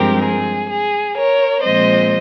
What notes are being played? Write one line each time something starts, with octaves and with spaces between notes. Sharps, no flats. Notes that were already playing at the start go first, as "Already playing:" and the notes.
Already playing: G2 F3 G#3 C4 G4 A#4
G#4
G#4
A#4 C#5
A#2 F3 G#3 C4 C5 D#5